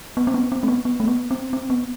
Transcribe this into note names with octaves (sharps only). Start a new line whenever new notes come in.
B3
C4
B3
C4
A3
B3
B3
A3
B3
C4
C4
B3